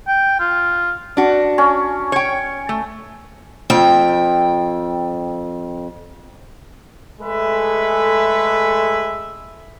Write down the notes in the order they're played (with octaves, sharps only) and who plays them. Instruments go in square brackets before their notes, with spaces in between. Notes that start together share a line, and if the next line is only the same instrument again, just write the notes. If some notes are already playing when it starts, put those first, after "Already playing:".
[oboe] G5
F4
[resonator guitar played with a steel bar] D4 F#4
[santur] C#4
[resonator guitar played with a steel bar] C#5 G5
A3
[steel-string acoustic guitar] F2 G5
[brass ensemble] G#3 A3 G#4 A4 B4 E5